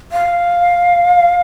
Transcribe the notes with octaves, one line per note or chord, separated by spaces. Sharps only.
F5